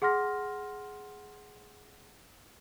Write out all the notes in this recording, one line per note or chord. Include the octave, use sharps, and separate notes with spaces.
G#4 F#5 C6 F6 A#6